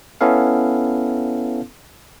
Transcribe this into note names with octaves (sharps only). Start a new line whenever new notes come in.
B3 C#4 E4 A4 F5